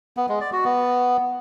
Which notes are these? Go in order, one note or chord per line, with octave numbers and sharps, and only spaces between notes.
B3
G#3
D5
F#4
B3